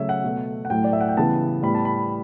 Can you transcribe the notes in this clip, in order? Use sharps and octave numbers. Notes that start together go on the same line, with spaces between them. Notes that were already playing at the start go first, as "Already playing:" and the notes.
Already playing: C#3 F#3 A3 C#5 E5
F#5
B2 A3
F#5
A2 F#3 A3 G5
D5
E5
F#5
G5
C#3 E3 G3 B3 A5
A2 G3 B3 B5
A5
B5